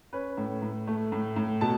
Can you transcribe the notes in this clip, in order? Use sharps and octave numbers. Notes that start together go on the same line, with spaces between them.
C#4 B4
A2
A2
A3
A2
A2
B2 A5